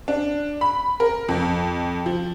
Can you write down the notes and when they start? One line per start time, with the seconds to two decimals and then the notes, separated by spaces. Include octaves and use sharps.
0.08 D4
0.61 B5
1.00 A#4
1.29 F2
2.06 F3